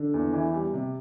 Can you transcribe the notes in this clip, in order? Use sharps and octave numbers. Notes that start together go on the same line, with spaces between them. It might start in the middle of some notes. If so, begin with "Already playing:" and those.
Already playing: D3
E2
E3
G3
C3